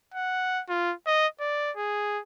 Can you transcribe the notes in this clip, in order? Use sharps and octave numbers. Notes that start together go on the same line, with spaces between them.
F#5
F4
D#5
D5
G#4